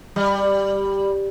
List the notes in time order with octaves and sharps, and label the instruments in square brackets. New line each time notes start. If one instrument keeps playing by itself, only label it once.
[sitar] G3